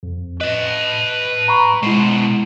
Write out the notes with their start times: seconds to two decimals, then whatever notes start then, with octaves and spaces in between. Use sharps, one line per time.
0.03 F2
0.41 B4 D#5 A5
1.48 A#5 B5 C#6
1.83 B2 G#3 E4 C5